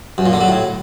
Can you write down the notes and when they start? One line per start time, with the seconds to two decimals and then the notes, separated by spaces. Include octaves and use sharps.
0.18 F#2
0.26 A#2
0.33 D3
0.41 F#3
0.48 A2